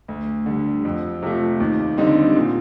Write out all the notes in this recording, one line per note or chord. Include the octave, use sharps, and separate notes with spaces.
D2
D3 G3
F2
C3 F3 A3
D#2
D3 G3 C4 D#4
A#2